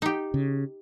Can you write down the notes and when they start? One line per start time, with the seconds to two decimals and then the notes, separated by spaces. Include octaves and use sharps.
0.02 D#4 G4
0.34 C#3